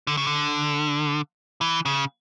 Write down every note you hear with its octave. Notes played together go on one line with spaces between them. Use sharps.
D3
C#3
D3
E3
C#3